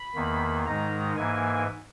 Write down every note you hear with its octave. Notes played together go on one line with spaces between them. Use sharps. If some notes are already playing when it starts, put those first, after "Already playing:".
Already playing: B5
E2 D#3 A#3
G#2 D#3 G#3 D#4 A#5
G#2 E3 A#3 G#5